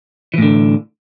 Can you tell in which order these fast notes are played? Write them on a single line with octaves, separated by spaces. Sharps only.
E3 A2 D3